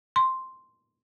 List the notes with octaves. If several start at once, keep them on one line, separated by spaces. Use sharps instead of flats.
C6